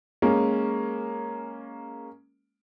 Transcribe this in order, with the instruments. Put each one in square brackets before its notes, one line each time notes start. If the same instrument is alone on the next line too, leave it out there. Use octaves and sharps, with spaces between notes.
[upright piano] G#3 A#3 C#4